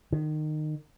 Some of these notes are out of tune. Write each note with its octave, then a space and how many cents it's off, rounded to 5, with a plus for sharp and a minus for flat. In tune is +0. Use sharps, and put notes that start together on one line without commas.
D#3 -25